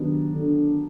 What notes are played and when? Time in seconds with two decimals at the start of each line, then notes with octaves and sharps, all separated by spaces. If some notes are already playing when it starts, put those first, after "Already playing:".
Already playing: D#3 F#3 B3 D4 G4
0.34 D3